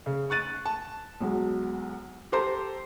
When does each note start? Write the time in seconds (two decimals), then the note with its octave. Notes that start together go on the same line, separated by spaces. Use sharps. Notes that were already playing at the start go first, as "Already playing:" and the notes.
0.06 C#3
0.30 C#6 F#6 A6 D#7
0.66 A5
1.20 B1 F#3 G#3
2.32 G4 A4 C5 A#5 C6